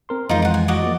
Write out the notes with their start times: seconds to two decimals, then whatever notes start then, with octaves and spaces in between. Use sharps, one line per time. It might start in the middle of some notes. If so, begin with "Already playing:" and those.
0.09 C4 A#4 C6
0.29 F2 E3 G#3 D#4 F4 C5
0.42 F4 F#5
0.54 G#5
0.68 F#4 D5 D#5
0.83 F3 A#3